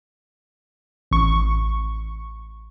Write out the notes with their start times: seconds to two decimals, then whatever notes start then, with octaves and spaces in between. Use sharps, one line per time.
1.11 A1 C#6